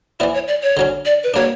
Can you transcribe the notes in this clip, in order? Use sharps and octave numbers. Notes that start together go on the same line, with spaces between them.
E3 B3 E4 D5
C#5
D5
C#5
D3 F#3 C#4
D5
B4
F#3 A#3 D4 C#5